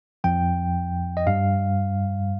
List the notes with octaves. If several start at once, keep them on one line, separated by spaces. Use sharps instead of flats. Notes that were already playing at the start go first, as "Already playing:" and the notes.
F2 F3 G5
D#5
G2 G3 F5